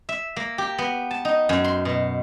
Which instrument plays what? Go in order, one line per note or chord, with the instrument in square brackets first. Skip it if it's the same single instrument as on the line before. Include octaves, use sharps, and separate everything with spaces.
[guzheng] E5
A#3
G4
B3
A5
D#4
F#2
C6
B2